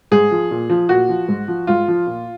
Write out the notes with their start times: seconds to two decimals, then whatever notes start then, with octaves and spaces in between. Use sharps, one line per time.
0.11 G#2 G#4
0.31 F3
0.51 A#2
0.70 F3
0.89 A#2 F#4
1.09 F3
1.28 G#2
1.48 F3
1.67 G#2 F4
1.88 F3
2.07 A#2